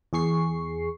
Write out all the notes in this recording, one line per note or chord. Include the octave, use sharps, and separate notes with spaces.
E2 G#4 C#6 C7